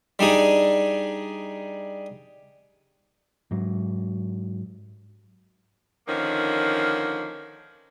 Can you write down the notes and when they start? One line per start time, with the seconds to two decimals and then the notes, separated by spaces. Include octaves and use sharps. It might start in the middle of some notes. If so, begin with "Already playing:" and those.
0.19 G3 D4 D#4 G#4
3.51 G#2 F#3
6.08 D3 D#3 F3 A#3 C#4